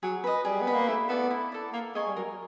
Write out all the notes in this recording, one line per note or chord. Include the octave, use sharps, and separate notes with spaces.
F#3 G#4
B4 D#5
G3 G#4
B3
B4 D#5
A#3
A3 E4
B3 A4 D5
E4
A4 D5
A#3 A#4
G#3 D#5 G#5 C#6
G3
F#3 A#4